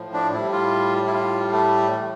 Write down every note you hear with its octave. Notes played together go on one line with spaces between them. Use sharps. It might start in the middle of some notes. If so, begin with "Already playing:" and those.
Already playing: A2 F3
D4
A2 G3 E4
F4
E4
F4
A3
A2 E3 G3